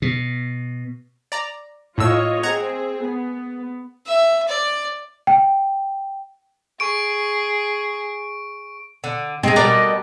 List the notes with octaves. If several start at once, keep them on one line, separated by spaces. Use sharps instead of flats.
B2
D5 A#5
A2 F4 C#5 D#5 E6
C4 G#4 F#5 A#5 G#6
B3
E5
D5
G5
G#4 C#6 D7
D3
C3 G#3 C4 D#5
B2 E3 G3 B3 A#4 D5